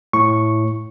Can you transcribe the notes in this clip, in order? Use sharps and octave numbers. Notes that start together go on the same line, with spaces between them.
A2 C#6